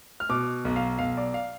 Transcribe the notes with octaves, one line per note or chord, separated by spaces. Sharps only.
F6
B2 D6
B1
F5
B1 F5
D5
F5